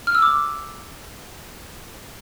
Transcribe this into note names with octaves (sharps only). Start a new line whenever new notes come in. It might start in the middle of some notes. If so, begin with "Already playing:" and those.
F6
E6
D6